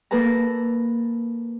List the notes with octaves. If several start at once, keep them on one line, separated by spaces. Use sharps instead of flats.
A#3 A4 B4 A5 A#5